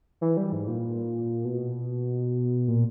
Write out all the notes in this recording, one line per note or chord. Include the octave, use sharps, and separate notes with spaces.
E3
G3
G#2
A#2
B2
A#2